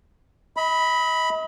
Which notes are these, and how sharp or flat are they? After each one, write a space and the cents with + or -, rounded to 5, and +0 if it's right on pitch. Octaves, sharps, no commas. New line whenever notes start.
D#5 +40 B5 +0